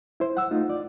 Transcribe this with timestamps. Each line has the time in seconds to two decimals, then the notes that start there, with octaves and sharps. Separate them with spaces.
0.20 E4 C5
0.37 F#5 E6
0.51 A3 D#4 F4
0.70 D5